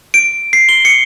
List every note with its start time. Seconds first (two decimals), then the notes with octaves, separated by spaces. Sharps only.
0.14 D7
0.53 C7
0.69 G7
0.85 C#7